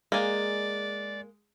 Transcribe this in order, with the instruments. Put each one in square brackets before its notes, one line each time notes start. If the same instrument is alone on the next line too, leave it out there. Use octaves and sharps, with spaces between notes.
[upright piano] G#3 [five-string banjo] A#3 G#5 [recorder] D5